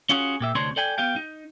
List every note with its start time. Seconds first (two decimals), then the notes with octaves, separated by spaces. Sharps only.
0.09 C#4 F4 F#4 G#4
0.40 A#2 G4 E5
0.55 D2 C3 C4 D4 C#5 C6
0.76 A4 D5 G5 G#5
0.98 B3 G4 F5 G5
1.16 D#4